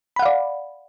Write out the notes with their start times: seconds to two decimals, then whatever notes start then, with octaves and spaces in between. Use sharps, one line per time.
0.16 B5
0.19 F#5
0.22 F5
0.26 D5